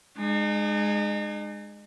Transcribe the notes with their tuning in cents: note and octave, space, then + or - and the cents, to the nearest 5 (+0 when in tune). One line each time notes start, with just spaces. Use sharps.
G#3 +0 D#4 -40